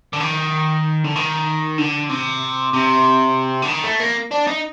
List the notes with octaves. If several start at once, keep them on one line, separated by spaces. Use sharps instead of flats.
D3
D#3
D3
D#3
D3
C3
C3
D3
D#3
A3
A#3
D4
D#4